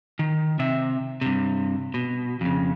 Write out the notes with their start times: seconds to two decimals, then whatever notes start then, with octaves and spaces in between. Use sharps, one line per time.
0.19 D#3
0.59 C3 E5
1.21 G2 C3
1.94 B2
2.41 F2 C#3